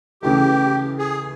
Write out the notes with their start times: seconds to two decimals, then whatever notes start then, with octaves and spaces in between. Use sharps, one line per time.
0.22 C#3 E3 A3 G4
0.98 G#4